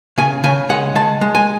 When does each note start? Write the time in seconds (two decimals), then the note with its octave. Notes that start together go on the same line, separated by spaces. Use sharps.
0.18 C#3 G#5
0.44 C#3 G#5
0.69 G#3 F#5
0.95 G#3 A5
1.21 G#3
1.35 G#5